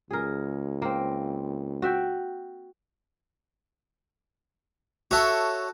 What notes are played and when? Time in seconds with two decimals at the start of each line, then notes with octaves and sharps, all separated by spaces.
0.11 C#2 G#4 A#4
0.82 A#3 C4
1.82 F#4 E5 G5
5.11 F#4 A4 C#5 E5